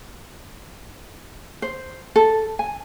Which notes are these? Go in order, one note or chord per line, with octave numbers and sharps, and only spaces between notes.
C5
A4
G#5